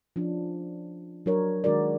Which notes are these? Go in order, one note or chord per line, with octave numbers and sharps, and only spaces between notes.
F3 C#4 D4
F#3 D4 A#4 C#5
D#3 G#3 D4 F#4 A#4 D5